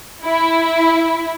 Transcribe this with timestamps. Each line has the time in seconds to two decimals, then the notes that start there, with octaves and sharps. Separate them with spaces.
0.25 E4